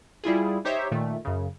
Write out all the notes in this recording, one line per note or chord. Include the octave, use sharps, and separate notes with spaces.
G3 E4 F4 G#4
D#4 G4 C5 C#5 E5
A#2 D#3 A3
F#2 C#3